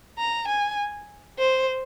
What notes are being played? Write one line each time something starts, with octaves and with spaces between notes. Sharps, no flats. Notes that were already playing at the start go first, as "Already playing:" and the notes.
A#5
G#5
C5